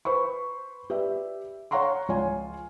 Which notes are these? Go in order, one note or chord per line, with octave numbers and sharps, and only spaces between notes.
B4 C5 B5 C#6
G4 B4 D5 E5
C#5 F5 F#5 A#5 C6 C#6
C#2 F3 F4 C#5 G#5